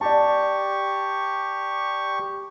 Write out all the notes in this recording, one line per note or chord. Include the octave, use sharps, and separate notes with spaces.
G4 D5 A5 C#6